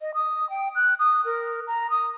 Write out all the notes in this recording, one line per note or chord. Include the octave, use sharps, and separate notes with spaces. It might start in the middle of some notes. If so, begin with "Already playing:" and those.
D#5
D#6
G5
F#6
D#6
A#4
A#5
D#6